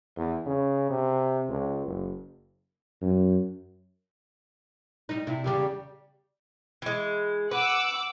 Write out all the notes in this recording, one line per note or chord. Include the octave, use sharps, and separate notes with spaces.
E2
C#3
C3
C#2
F#1
F#2
G3 D#4
C3 E4
E2 C#3 G3 G4
E3 G#3
B4 F#5 D6 E6